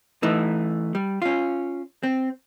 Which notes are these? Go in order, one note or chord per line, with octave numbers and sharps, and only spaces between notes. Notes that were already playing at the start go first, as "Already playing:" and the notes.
E3 A3 D#4
G3
C#4 F4
C4